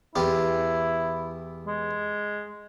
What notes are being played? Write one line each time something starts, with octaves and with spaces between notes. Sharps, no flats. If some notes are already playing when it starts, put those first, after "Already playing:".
E2 E4 F4 G4
G#3